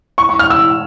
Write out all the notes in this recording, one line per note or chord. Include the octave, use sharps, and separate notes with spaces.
C#6
C#6
F6
E6